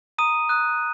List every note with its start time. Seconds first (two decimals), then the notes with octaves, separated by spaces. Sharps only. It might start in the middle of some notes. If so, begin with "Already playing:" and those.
0.18 A#5 D#6 D#7
0.49 D#6 F#6